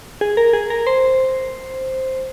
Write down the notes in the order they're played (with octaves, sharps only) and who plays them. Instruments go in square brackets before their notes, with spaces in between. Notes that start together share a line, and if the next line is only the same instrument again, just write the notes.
[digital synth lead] G#4
A#4
G#4
A#4
C5